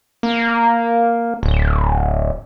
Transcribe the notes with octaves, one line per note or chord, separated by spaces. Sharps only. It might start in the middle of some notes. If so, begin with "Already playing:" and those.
A#3
D1